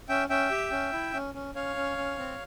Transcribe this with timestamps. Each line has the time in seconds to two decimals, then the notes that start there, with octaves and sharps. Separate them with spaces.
0.09 C#4 E5 G5
0.30 C#4 E5 G5
0.51 G4
0.71 C#4
0.93 E4
1.14 C#4
1.34 C#4
1.55 C#4 C#5 F5
1.76 C#4
1.97 C#4
2.19 C4